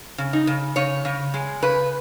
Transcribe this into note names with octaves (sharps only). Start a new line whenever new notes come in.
C#3
D#4
C#3
C#3 C#5
C#3
G#3
C#3 B4